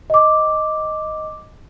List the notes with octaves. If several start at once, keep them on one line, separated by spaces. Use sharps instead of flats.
D#5 D6